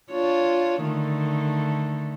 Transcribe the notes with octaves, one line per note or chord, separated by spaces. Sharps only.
D4 F4 C#5
D3 D#3 A3